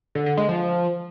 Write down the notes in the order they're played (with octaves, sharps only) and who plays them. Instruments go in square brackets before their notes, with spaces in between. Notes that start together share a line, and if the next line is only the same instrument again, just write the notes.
[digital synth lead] D3
D3
G#3
F3